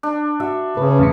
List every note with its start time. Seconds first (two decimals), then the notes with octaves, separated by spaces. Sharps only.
0.03 D4
0.40 F#4 E5
0.77 C#3 B4
0.99 E2 A2 C3